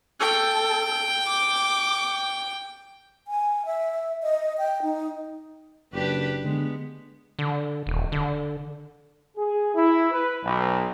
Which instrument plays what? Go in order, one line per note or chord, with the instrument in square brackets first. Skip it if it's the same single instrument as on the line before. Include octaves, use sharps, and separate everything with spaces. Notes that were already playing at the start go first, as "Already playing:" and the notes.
[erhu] A4 [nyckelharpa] G5
[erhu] D6
[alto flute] G#5
E5
D#5
G5
D#4
[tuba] F#1 [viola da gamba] D4 G4 B4
[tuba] D3 [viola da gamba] G#3 B3
[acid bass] D3
D#1
D3
[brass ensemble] G#4
E4
B4
B1